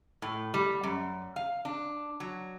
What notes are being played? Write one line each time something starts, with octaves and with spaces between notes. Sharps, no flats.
A2
G3
F#2
F5
D4
F#3